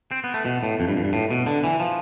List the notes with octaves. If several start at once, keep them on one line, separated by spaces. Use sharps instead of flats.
C4
B3
A3
B2
A2
F2
G2
F2
G2
A2
B2
D3
E3
F3